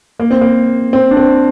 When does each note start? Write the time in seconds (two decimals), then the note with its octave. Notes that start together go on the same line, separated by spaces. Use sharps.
0.19 A#3
0.31 C4
0.41 A#3
0.93 C4
1.11 D4
1.17 C4